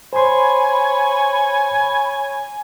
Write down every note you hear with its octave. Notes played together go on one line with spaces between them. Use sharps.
C5 C#5 G#5 B5 C6